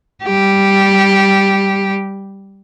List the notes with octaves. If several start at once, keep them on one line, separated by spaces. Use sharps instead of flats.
G3 G4